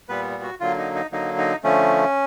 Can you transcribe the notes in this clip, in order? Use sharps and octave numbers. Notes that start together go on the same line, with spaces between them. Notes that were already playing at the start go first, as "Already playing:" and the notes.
A#2 G3 B3 B4
F#4
D3 F#3 A#3 F4
D#4
D#4
D3 F#3 A#3 D#4
D#4
D3 F3 A3 C#4